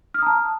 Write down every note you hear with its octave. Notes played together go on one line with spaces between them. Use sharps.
A5 A#5 D#6 F6